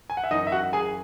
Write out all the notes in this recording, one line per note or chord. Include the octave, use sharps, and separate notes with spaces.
G#5
F#5
E5
F#2 E3 D#4 D#5
E5
F#4 F#5
G#4 G#5